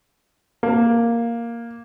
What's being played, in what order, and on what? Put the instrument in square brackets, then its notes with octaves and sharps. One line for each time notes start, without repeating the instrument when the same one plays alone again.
[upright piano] A#3